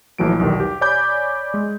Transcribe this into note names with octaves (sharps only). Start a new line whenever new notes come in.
A#1 E3 F#3 A3 D7
B1 E2 D#3 G3
G4
C#5 D5 G#5 B5 D6 G6
G#3